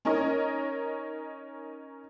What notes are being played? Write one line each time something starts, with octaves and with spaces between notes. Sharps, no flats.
C#4 D#4 A#4 C#5 D#5